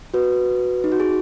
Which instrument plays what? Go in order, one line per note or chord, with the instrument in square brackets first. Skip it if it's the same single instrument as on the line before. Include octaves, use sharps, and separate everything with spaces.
[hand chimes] F#4 B4
D#4
F#4
G#4